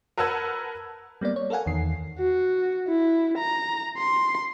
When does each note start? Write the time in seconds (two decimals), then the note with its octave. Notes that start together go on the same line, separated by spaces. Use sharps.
0.18 A#4 B4 F#5 A5 E6 G#6
1.21 G3 A#3 B3 D5
1.36 C#5
1.50 A4 A#4 F5 F#5 G#5
1.66 E2 D#3 C7
2.19 F#4
2.88 E4
3.38 A#5
3.98 C6